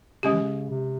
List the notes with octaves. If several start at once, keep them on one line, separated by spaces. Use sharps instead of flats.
C#3 G#3 C#4 G4
E3
C#3
C3